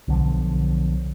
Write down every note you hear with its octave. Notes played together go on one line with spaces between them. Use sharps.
B1 D3 F3